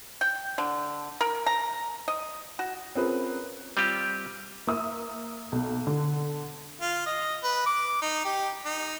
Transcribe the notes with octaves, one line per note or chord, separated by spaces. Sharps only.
G5
D3
A#4
A#5
D#5
F#4
C4 C#4 F4 G#4 A#4 B4
G3 C4 F4 G4
A#3 E5 D#6 E6
B1
D3
F4
D#5
B4
D6
D#4
G4
D#4